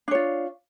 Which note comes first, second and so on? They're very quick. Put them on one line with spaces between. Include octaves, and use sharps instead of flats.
D4 C#5 F4